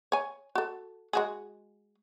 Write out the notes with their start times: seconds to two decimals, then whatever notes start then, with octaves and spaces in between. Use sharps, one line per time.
0.12 C#5 G#5
0.55 F#4 A4
1.13 G#3 F#4 G#4